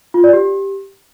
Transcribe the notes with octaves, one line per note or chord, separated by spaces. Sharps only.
F4
D5
G4